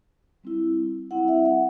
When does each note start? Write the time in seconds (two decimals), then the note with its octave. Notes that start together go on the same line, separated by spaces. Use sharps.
0.43 G3 C4 E4
1.11 G3 C4 E4 F#5
1.28 E5
1.46 F#5